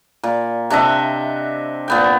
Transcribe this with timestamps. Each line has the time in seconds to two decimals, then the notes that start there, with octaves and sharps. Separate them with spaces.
0.23 A#2
0.70 C3 D4 D#5 E5
1.88 A#2 B3 G5